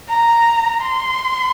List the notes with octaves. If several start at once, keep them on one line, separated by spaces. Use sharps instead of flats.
A#5
C6